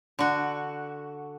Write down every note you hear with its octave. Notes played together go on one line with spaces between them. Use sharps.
D3 F#4